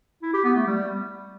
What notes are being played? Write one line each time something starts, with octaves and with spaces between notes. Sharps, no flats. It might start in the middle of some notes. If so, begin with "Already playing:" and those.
E4
G4
B3
A3
G3